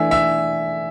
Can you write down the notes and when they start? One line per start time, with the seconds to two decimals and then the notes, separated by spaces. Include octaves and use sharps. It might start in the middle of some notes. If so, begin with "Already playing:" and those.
Already playing: E3 A3 D4 A4 E5 G#5
0.11 E5